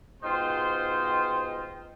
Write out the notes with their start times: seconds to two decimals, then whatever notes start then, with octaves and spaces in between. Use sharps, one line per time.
0.23 G#2 B2 D#4 F4 C5 G5